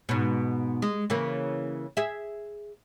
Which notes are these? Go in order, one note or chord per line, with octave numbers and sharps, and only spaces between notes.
G#2 B2
G#3
C#3 E3 A#3
G#4 E5